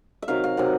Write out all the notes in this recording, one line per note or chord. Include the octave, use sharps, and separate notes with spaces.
E5
C3 D#3 F#3 F5
F5
C3 D#3 F#3 F#5